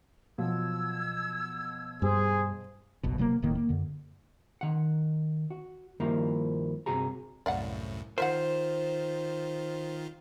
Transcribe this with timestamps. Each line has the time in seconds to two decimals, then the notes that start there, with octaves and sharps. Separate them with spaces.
0.38 B2 F3 F#3 E6 G#6
2.02 G2 G#4 C5
3.03 F#1 B1 B2
3.18 C3 F#3 G3 A#3
3.42 D#1 A2 D#3 A#3
3.55 A#3
3.69 F#2 D3
4.61 D#3 F#5
5.50 F#4
6.00 G2 D#3 F3 G3 A#3 E4
6.86 G2 C3 F#4 G#4 A#5
7.46 C2 F#2 A2 D5 F5 F#5
8.18 D#3 F4 A#4 C5 E5 F#5